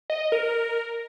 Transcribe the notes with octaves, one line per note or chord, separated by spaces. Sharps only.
D#5
A#4